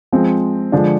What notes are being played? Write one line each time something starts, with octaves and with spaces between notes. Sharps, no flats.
F3 G#3 C4
D3 F3 G#3 D4